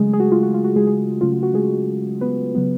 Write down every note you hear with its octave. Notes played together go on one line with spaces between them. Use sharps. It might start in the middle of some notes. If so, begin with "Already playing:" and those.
Already playing: C#3 F#3 G#3 A3 G#4
G#4
F#4
F4
F#4
F4
F#4
G#3 G#4
G#3 G#4
C#3 F#3 A3 C#4 F4
F#4
F#4
G#3 G#4
B3 B4
C#3 F#3 B3